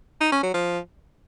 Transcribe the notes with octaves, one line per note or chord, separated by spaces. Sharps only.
D#4
C#4
F#3
F3